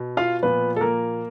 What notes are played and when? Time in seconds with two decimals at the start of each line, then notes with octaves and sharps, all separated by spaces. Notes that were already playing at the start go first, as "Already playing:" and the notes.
Already playing: B2
0.17 F4 F5
0.43 A#2 F3 B3 B4
0.76 A4
0.81 A#3 A#4